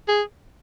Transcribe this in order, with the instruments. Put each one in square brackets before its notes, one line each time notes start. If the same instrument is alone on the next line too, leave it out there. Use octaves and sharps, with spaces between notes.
[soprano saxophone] G#4